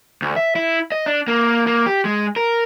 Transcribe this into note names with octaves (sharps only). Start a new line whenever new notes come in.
D2
E5
E4
D#5
D4
A#3
A#3
G4
G#3
A#4